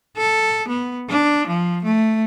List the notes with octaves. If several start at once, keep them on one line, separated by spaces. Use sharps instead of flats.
A4
B3
D4
F3
A3